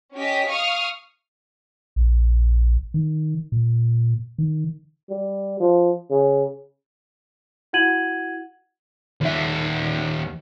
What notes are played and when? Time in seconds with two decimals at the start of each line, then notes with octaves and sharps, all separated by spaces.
0.15 C#4 G4 D#5 B6
0.47 F5 C#6 D#6 F6
1.96 A#1
2.94 D#3
3.52 A#2
4.38 D#3
5.10 G3
5.60 F3
6.10 C#3
7.73 E4 F#4 F#5 G#6 D#7 F#7
9.21 D#2 E5